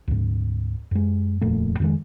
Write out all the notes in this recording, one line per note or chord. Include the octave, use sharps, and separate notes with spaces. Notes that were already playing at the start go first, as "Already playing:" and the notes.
D2 G#2
F#2 G#3
D#1 F2 A#2 A3
F2 D#3 G#3